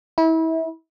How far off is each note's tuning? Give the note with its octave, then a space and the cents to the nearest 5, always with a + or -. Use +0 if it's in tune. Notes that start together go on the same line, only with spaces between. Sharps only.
E4 -30